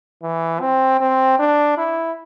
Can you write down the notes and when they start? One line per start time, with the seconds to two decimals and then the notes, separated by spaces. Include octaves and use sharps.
0.22 E3
0.60 C4
1.00 C4
1.39 D4
1.77 E4